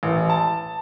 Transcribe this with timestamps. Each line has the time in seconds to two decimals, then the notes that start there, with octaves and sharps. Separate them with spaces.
0.03 A1
0.29 A5